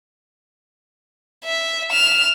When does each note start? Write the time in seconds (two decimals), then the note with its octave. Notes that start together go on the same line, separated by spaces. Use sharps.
1.45 E5
1.91 F6 E7